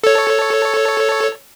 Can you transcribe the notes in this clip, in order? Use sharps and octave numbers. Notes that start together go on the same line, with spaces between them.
A4 C#5